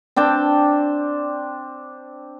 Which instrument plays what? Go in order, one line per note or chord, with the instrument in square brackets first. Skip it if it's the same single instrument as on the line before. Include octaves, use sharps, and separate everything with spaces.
[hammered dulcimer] C4 D4 G5 A5